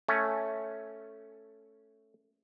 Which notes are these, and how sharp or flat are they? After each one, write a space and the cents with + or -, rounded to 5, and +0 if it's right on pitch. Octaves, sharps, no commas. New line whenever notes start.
A3 +0 C#4 +0